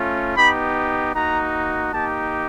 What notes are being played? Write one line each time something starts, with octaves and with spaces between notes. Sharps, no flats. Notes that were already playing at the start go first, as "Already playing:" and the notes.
Already playing: A3 C#4 F4
B3 D#4 G4 B5
A#3 D#4 F#4 A#5
A#3 D#4 G4 A5